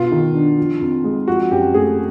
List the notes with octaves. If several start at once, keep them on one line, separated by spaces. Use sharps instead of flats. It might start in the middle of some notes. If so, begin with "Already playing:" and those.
Already playing: B2 B3 F4
D#3
D4
F3
F2
G#3
F3 F#4
F#2 G4
A3 G#4